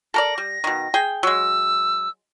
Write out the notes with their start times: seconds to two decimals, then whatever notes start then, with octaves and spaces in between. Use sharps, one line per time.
0.14 A4 A#4 D5 A#6
0.38 G3
0.64 B2 D#3
0.94 G#4 G5
1.23 F#3 G#3 E6